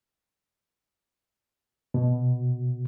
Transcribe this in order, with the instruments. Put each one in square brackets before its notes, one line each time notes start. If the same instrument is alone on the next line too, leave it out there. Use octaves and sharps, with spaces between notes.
[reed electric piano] B2